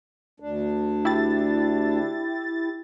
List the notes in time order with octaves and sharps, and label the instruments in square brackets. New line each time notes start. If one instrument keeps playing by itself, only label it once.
[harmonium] D2 D4
[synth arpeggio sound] E4 G4 A6